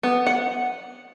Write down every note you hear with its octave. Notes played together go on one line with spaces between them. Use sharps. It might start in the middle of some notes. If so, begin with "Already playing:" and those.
B3
F#5